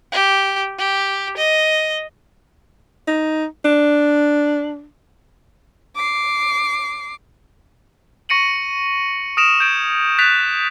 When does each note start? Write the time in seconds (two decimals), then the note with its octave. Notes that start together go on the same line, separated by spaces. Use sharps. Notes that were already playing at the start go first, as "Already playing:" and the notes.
0.12 G4
0.78 G4
1.37 D#5
3.07 D#4
3.64 D4
5.96 D6 C7
8.29 C#6 A#6 C#7 D#7 F#7
9.37 D#6 F6 A#6 D7 E7 F7
9.60 G6 G#6 D7
10.18 F6 F#6 A6 B6 E7 F7